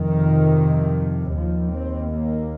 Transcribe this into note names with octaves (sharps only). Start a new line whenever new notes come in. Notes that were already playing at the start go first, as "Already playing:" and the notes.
Already playing: F2 C3 D#3
D#2 F3
C4
A#3